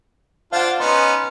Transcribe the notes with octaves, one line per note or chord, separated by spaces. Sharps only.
D4 F4 C5 F5 F#5
B3 C#4 D#4 C6